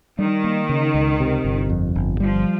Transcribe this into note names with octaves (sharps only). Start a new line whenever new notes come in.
D#3 G3
A#3
C#3
C#2
C3
G1
F2
G1
F3 G3